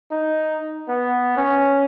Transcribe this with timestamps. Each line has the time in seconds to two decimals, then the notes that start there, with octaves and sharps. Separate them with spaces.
0.11 D#4
0.89 B3
1.37 C#4